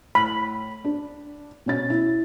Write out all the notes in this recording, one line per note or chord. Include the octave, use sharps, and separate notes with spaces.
A2 B5
D4
B2 C#4 A6
E4